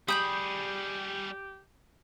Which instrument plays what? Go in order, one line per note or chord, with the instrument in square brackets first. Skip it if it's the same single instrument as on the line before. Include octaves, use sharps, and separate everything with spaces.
[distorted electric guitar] G3 G#4 [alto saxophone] G4 [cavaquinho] B5 [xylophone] D#6 G6 F#7